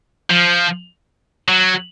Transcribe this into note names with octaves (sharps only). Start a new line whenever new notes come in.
F3
F#3